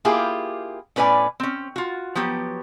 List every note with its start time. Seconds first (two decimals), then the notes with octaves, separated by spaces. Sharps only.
0.05 A#3 E4 F4 G4 G#4
0.96 A2 C#4 B4 D5 G#5
1.40 C4 C#4
1.76 F4 F#4
2.15 F3 F#3 B3 G4